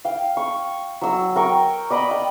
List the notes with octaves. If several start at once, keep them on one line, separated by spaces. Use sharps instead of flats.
F5 G5
C#6
F#3 E6
A#4 G5 C#6
D5 D#5 B5 D6
G5